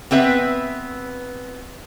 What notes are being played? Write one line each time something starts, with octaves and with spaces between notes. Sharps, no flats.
B3 C4 B4 E5